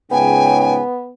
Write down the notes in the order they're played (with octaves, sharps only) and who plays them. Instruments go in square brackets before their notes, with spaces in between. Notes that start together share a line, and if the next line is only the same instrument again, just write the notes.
[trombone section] C#2 G#2 C#3 [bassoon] B3 [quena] G5 [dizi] G#5